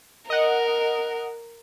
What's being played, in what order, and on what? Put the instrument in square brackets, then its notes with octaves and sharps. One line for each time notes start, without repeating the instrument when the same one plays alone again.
[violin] A#4 [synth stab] D#5 F#5